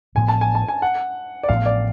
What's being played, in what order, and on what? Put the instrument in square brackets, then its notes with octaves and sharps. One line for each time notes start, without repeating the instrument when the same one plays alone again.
[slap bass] A1 A2 F3 B3 [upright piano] G#5
[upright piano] A5
G#5
A5
G#5
F#5
D5
[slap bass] A1 A2 F3 B3 [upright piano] F5
[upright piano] D5